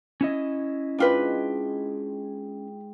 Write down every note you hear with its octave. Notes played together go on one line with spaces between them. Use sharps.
C#4 E4 D#5
G#2 D4 F4 B4 G5